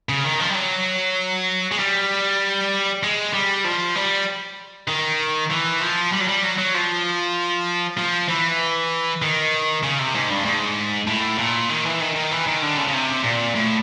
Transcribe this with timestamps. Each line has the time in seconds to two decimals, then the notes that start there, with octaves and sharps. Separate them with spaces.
0.09 C#3
0.24 D#3
0.40 F3
0.50 G3
0.55 F#3
1.72 G#3
1.79 G3
3.03 G#3
3.33 G3
3.64 F3
3.95 G3
4.88 D#3
5.50 E3
5.81 F3
6.13 G3
6.20 F#3
6.28 G3
6.43 F#3
6.58 F#3
6.74 F3
7.98 F3
8.28 E3
9.22 D#3
9.83 C#3
9.99 C3
10.15 G#2
10.30 G2
10.45 G#2
11.07 A2
11.38 A#2
11.69 D#3
11.85 E3
12.00 D#3
12.16 D#3
12.31 E3
12.47 D#3
12.62 D3
12.77 C#3
12.88 C#3
12.93 C3
13.24 A#2
13.55 A2